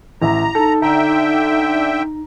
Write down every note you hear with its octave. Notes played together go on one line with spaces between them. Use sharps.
A1 E5 A#5
D#4 A4
D3 E5 G5 A#5